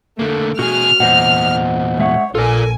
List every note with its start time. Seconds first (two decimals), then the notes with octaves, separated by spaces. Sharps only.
0.19 D3 A3 A#3
0.59 B2 F#4 G#4 F6
1.00 E2 A#2 C5 D#5 F#5
1.99 G#3 C#5 E5 F#5
2.35 A#1 F4 A4 A#4 D5 G#5